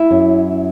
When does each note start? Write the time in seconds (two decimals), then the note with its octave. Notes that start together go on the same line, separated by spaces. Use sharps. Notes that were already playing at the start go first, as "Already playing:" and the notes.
Already playing: E4
0.11 F#2